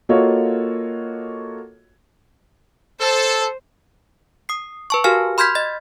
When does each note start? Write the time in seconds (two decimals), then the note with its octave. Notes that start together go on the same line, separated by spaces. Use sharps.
0.09 A#3 F4 F#4 A4 C#5 D#5
3.01 A4 C5
4.49 D#6 C7
4.90 B4 A5 C#6
5.04 F#4 G4 A#4 F5 G#5 F6
5.38 B5 C6 F6 G6 G#6 B6
5.55 D#5 A6